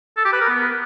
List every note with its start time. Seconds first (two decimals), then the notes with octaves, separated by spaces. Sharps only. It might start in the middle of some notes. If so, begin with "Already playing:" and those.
0.17 A4
0.25 G4
0.33 B4
0.41 A#4
0.49 B3